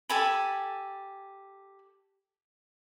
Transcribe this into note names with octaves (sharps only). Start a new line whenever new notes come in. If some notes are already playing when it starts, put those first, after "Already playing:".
G4 A4 G#5 B5